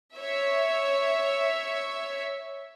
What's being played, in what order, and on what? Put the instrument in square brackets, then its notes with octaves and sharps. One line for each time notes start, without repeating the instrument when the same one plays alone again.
[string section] C#5 E5